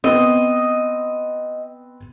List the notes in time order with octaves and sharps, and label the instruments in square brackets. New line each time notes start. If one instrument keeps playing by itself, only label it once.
[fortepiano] B3 C4 [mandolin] D#5